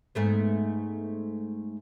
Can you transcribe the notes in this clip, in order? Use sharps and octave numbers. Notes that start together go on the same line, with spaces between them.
G#2 A3 B3